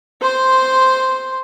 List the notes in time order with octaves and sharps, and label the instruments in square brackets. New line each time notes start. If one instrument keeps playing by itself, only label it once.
[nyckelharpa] C5 C6